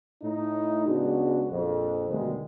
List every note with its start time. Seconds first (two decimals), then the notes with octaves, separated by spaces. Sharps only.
0.23 A2 D#4
0.87 C#2 G#3 B3 D4 F#4
1.49 A#1 F2
2.09 D2 G2 B2 D3 D#3 G#3